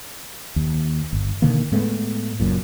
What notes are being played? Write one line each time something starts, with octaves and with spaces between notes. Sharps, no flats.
D#2
G1
B2 D3 D#3 A#3
A2 G#3 A3 B3
F#1 F#2 A#2